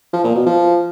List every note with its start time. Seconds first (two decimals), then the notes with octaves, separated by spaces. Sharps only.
0.13 F3
0.24 A#2
0.35 B2
0.46 F3